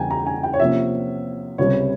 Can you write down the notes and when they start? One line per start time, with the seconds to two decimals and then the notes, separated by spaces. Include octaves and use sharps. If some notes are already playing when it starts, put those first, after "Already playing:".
Already playing: E2 C#3 G3 G5 G#5 A#5
0.11 A#5
0.26 G#5
0.43 G5
0.54 C#5
0.60 C3 F3 A#3 C#4 E5
1.58 C#2 C3 G3 C#5